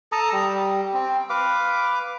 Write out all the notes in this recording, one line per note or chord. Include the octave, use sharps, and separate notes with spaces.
A4 A5 A#5 D#6
G3
C4
B4 F5 D6